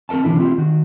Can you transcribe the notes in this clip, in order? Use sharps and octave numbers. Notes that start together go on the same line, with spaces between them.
C4 A4 A#4 E5 A5
B1 D3 E3 D4 E4
C4 E4 F4 G4
D#3 F#4